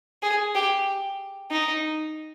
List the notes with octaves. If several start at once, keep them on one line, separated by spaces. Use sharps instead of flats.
G#4
G4
D#4